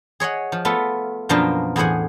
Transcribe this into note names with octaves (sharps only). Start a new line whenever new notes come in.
G#4 C#5 D#5 F#5
F3
A3 B3 F4 A4
F#2 B2 F3 A#3 D4 F4
E2 A2 G#4 C5 F#5 G#5